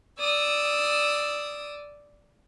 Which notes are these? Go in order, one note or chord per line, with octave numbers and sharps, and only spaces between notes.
D5 D#6 E6